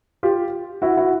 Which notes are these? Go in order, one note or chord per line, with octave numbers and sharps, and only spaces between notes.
F4 G4
E4 F#4
E4 F#4